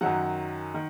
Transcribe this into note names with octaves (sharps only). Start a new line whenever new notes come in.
F#2 D#3 F#3 F#5
D#3